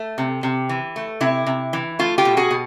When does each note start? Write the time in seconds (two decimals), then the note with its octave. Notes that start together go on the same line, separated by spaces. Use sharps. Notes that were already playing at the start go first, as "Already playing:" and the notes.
Already playing: A3
0.18 C3
0.43 C3
0.69 E3
0.96 A3
1.21 C3 E4
1.46 C3
1.73 E3
1.99 A3 F4
2.18 F4 G4
2.25 B2
2.37 F#4 G#4
2.51 B2